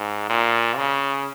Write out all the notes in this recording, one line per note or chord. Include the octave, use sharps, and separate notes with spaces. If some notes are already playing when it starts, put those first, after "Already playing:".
Already playing: G#2
A#2
C#3